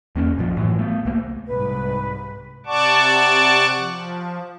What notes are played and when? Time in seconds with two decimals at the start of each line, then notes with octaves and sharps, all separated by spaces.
0.16 E2 A#3 C#4
0.37 A#1 F#2 F3
0.57 A2 E3 F#3
0.79 A3 B3
1.05 C2 A3 A#3
1.47 C2 G#2 B4
2.66 C3 D5 F#5 A5 C#6 D6
3.76 F3